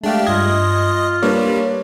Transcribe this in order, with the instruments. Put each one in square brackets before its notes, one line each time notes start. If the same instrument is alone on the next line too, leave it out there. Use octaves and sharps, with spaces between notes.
[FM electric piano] G#3 F5 [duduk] A3 [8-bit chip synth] D4 G4
[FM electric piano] G2 G#6 [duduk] F4 [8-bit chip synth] D#5
[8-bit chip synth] G3 [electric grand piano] A#3 D4 [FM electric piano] B4 C#5